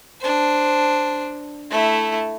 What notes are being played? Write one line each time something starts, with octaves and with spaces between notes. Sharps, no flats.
D4 C5
A3 E4